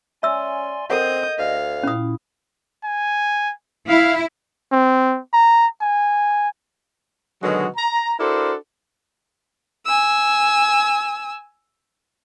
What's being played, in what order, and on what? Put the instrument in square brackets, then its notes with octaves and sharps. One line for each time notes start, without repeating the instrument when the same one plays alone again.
[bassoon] C#4 [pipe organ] D5 G#5 C6 [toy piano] E5 E6
[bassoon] C4 [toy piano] A4 A#4 F#5 [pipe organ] D#5 [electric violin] D#6 G6
[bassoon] D2 [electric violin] F5
[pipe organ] A#2 E4 [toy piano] C#4 D#6
[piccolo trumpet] G#5
[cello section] E4 [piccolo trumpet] F5
[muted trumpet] C4
A#5
G#5
[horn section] B2 D3 D#3 F#3 G#3 F#4
A#5
D4 E4 F#4 A4 A#4 C5
[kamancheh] G#5 E6